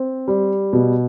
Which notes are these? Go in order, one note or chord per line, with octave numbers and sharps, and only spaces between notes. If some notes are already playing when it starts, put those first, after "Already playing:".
Already playing: C4
G3
B2